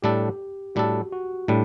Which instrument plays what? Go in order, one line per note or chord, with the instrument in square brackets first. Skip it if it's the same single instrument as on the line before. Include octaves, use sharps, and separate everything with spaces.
[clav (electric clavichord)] A2 G3 D4 A4 [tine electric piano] G4
[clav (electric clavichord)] A2 G3 D4 A4 [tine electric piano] F#4
[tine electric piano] F#4
[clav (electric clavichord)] A2 G3 [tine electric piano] D4